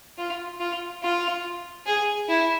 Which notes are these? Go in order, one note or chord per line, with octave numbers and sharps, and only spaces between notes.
F4
F4
F4
G#4
E4